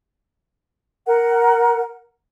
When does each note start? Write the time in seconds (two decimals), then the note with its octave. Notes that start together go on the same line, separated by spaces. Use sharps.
1.08 A#4 F#5